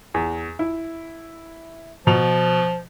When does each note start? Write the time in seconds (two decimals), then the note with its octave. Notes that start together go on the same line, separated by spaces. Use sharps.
0.14 E2
0.59 E4
2.07 B2 F3 F7